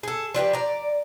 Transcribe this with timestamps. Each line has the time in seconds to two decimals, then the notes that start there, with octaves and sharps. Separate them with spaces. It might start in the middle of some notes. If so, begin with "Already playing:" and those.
0.03 G#4 A4
0.34 F3 D4 G4 B4
0.53 D5 A#5